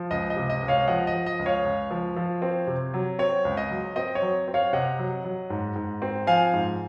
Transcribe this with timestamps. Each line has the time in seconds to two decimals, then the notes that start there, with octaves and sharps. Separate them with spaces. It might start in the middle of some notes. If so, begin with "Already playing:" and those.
Already playing: F3
0.11 C#2 D#5
0.30 D#5
0.36 C3
0.50 D#5
0.62 C#2
0.68 C#5 F5
0.88 F3 D#5 F#5
1.07 D#5
1.13 F3
1.26 D#5
1.39 C#2
1.46 C#5 F5
1.65 C#2
1.91 F3
2.16 F3
2.42 C4
2.67 C3
2.94 F#3
3.19 C4 C#5
3.45 C#2
3.57 D#5
3.71 F#3
3.96 C4 D#5
4.15 C#5
4.22 F#3
4.48 C4
4.54 C#5 F5
4.73 C3 D#5 F#5
4.99 F#3
5.24 F#3
5.50 G#2
5.76 G#2
6.02 C4
6.27 F3 F5 G#5
6.54 G#2